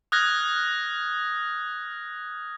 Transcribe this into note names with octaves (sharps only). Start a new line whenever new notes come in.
D#6 F6 F#6 G#6 A#6